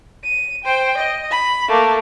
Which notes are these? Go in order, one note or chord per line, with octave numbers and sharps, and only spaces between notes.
D#7
C5 G5
D#5
B5
A3 A#3